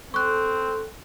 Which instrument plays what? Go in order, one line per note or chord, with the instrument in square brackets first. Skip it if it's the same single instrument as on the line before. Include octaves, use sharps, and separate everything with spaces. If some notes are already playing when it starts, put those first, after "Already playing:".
[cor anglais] C4 [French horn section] A4 [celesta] C#6 F#6